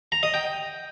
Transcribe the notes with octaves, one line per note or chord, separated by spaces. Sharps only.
A#5
D#5
G5